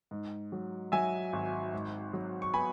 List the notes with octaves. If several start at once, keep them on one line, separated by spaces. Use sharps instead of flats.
G#2
F#3
F#3 E5 G#5
G#1
G#2
F#3
C#6
B3 G#5 B5